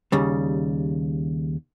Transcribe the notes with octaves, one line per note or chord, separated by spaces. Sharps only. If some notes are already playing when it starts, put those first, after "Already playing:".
D#2 C#3 G3